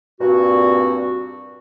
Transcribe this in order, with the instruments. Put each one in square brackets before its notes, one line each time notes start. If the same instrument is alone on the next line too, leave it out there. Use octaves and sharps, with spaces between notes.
[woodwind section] G2 A#2 C4 F#4